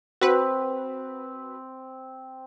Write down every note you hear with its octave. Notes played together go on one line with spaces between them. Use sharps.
C4 F#4 B4